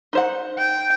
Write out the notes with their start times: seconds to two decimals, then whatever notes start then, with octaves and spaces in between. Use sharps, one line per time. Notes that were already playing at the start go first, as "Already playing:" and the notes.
0.13 D#4 C5 F#5
0.58 G5